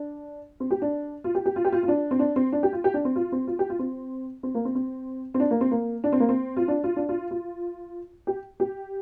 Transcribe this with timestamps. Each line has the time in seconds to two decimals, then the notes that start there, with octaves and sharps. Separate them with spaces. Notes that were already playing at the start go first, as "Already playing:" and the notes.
Already playing: D4
0.60 C4
0.71 G4
0.82 D4
1.24 F4
1.35 G4
1.46 G4
1.56 F4
1.65 G4
1.72 F4
1.83 F4
1.88 D4
2.11 C4
2.19 D4
2.36 C4
2.52 D4
2.63 G4
2.73 F4
2.84 G4
2.94 D4
3.05 C4
3.16 F4
3.32 C4
3.47 F4
3.59 G4
3.70 F4
3.79 C4
4.43 C4
4.55 A#3
4.65 C4
4.75 C4
5.34 C4
5.40 D4
5.51 A#3
5.61 C4
5.71 A#3
6.04 D4
6.12 C4
6.20 A#3
6.29 C4
6.57 F4
6.68 D4
6.84 F4
6.96 D4
7.09 F4
7.31 F4
8.27 G4
8.60 G4